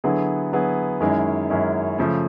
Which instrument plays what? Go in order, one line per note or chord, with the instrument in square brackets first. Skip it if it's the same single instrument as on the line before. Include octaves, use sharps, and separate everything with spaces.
[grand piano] D3 F#3 B3 E4 G#4
D3 F#3 B3 E4 G#4
F#2 D#3 G#3 C#4 E4
F#2 D#3 G#3 C#4 E4
C#3 F3 A3